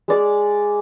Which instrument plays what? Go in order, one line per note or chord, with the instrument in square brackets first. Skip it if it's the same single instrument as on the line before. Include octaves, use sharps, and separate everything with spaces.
[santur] G#3 D5